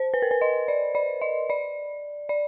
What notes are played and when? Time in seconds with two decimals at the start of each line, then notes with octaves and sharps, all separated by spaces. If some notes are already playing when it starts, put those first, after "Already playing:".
Already playing: C5
0.14 B4
0.22 A#4
0.31 B4
0.41 D#5
0.68 D5
0.95 D5
1.21 D#5
1.50 D5
2.29 D5